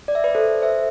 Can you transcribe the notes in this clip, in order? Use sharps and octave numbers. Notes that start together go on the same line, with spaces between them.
D5
E5
B4 D5
A4 C5
C5 E5